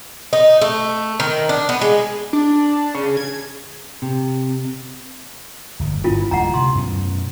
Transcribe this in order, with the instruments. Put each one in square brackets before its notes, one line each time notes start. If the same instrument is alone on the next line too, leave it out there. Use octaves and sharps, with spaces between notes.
[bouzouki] D#4
A3
D#3
D4
B3
G#3
[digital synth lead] D4
C#3
G#6
[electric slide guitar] C3
[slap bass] D1 G1
[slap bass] G1 B3 [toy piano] E4 F4
[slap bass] D1 D2 G#3 [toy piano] F#5 A#5
[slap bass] C3 [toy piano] C6
[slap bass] F#2 B2 C#4